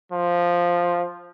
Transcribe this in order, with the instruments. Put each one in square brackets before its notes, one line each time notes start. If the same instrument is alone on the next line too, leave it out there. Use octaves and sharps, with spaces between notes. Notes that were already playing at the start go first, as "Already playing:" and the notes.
[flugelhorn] F3